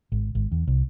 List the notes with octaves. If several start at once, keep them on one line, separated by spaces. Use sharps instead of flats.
G#1
G#1
E2
C2